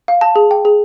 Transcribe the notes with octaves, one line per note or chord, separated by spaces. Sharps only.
F5
A5
G#4
G5
G#4